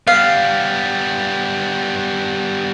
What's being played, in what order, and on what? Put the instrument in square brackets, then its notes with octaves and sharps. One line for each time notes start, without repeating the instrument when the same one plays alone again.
[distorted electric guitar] G3 B3 [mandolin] F5